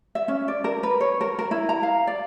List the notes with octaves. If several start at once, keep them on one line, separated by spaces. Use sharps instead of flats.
E5
C#4
D5
A#4
B4
C#5
A#4
A#4
E4
A#5
F5
D5